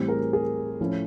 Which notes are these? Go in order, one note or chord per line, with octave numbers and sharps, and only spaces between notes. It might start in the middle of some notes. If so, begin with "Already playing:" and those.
Already playing: A2 E3 G3 C4
G#4 A#4
G#4 A#4
A2 F3 A3 C#4 E4